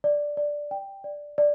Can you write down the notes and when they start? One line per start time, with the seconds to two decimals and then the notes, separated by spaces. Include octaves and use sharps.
0.04 D5
0.37 D5
0.71 G5
1.04 D5
1.38 D5